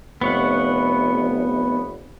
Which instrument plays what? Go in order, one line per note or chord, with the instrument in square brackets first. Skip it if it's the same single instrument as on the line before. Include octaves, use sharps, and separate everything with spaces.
[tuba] F1 [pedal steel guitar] B3 C#5 F#5